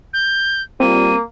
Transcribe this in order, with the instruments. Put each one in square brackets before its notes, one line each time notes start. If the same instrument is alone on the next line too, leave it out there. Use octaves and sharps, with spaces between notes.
[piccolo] G6
[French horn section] G3 F4 [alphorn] A#3 [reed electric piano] C4 [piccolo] D#7